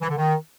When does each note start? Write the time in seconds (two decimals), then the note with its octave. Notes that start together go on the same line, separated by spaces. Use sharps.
0.02 E3
0.10 D3
0.17 D#3